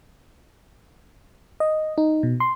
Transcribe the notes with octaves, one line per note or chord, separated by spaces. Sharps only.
D#5
D#4
B2
C6